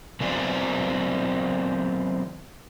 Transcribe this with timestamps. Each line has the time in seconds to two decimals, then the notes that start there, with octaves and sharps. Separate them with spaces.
0.20 D#3 F#3 B3 C4 B4 D5